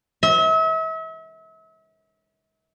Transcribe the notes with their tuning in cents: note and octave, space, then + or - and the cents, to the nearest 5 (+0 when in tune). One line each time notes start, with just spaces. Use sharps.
E5 -40